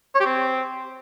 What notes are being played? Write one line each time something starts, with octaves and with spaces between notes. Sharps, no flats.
C#5
G4
C4